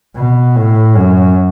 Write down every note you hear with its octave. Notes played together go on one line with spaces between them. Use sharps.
B2
A2
F#2